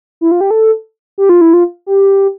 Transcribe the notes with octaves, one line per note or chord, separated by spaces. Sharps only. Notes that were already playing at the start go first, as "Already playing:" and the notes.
E4
F4
G4
A4
G4
F4
E4
F4
G4